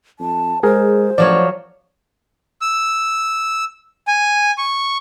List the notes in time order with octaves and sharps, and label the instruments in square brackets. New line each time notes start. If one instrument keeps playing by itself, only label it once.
[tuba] F2 [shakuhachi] A5
[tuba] G#3 [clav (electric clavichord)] G#4 A#4 [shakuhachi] C5
[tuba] A1 [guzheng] F3 F#3 C#5 [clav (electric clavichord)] D5
[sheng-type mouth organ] E6
G#5
C#6